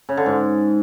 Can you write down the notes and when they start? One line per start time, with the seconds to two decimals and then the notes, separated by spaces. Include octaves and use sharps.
0.09 C#3
0.17 D3
0.26 G#2